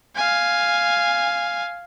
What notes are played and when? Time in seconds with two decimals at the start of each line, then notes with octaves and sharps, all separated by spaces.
0.16 F5 G#5